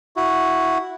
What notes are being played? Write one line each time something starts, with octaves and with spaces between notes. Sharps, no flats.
E4 F#4